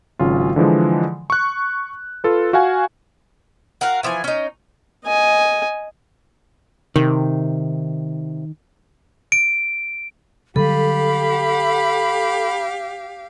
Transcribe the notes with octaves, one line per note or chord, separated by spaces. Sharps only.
G#1 C#3 F#3 F4
D3 E3 F3 G#3
C#6 F#6
F4 A4 B4
F#4 F5 F#5 G#5
F#4 A#4 F5 F#5
E3 F3 C#5 G#5
C#4 D#4
D#5 G#5
C3 D#3
D7
D3 F#3 G3 G4 A4 F5 B5